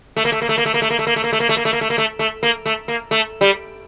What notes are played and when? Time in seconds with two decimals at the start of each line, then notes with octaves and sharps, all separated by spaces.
0.17 A3
0.25 A#3
0.32 A3
0.42 A#3
0.49 A3
0.58 A#3
0.66 A3
0.74 A#3
0.82 A3
0.90 A#3
0.99 A3
1.07 A#3
1.16 A3
1.24 A#3
1.33 A3
1.40 A#3
1.49 A3
1.57 A#3
1.65 A3
1.73 A#3
1.81 A3
1.90 A#3
1.98 A3
2.19 A3
2.43 A#3
2.66 A3
2.88 A#3
3.11 A3
3.41 G3